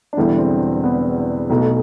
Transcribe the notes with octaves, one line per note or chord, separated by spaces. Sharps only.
D4
E1 E2 D3 G3 B3 E4
C4
B3
B1 B2 A3